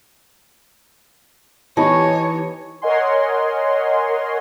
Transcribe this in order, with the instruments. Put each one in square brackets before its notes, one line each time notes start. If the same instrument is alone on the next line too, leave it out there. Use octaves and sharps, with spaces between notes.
[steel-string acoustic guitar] E3 [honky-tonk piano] B3 D#4 G4 [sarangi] C#5 [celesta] A5 B5 C#6
[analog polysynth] A#4 C#5 D#5 F#5 G#5 C6